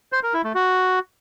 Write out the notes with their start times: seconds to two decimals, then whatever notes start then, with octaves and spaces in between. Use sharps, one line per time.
0.12 C5
0.23 A#4
0.34 E4
0.44 A3
0.55 F#4